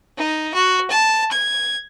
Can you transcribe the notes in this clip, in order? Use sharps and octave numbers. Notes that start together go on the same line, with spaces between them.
D#4
F#4
A5
G#6